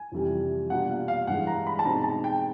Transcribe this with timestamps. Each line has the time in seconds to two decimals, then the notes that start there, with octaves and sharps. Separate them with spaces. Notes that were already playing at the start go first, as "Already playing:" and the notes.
Already playing: G#5
0.12 F2 C3 E3 G3
0.70 B2 G3 A#3 D4 F4 F#5
0.90 F5
1.08 F5
1.27 G2 E3 G#3 F#5
1.47 A#5
1.67 B5
1.79 A5
1.85 B2 G#3 C4 D#4 A#5
2.04 A5
2.24 G5